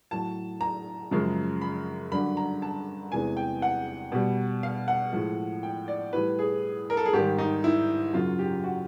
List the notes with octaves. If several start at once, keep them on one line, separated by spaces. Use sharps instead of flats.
A2 F#3 A5
A#5
F#2 C#3 F3 G#3
B5
G2 D3 F#3 B5
A#5
A5
E2 C3 E3 G#3 G#5
G5
F#5
B2 G3
F5
F#5
A2 F3 G#3
G5
D5
A2 E3 G3 B4
G#4
A#4
A4
G#4
G#2 D#3 G3 G4
D#4
E4
F#2 C#3 F#3 F4
G4
F#4